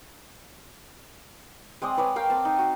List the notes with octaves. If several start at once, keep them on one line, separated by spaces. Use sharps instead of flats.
G#3 C4 D5 D#6
B4 C#5 D5 G#5
A#4 F5 G5
C4 A5
D#4
F#4